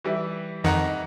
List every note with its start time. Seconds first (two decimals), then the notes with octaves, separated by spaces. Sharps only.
0.04 E3 G3 E4
0.64 F2 D#3 D#5 F#5 A#5